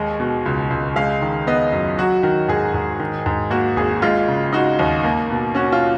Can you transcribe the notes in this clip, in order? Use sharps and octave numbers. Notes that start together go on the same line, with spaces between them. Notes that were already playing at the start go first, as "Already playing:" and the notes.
Already playing: D#2 G#3
B2
C#2
C#2
G#3 F5
D#3
B3 D#5
F#2
F#3 F#4
D#3
G#2 G#4
G#2
D#3
G#2
A#3 F#4
G#1 G#4
G#3 F4
C#3
D#4 F#4
D#2
A#3
B2
C#4 F#4
F4